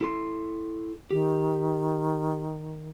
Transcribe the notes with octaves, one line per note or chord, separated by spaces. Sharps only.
E4 A4 C6
D#3 G4